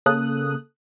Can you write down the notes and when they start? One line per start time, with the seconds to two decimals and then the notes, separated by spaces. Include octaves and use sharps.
0.06 C#3 A#3 A4 D#6 F#6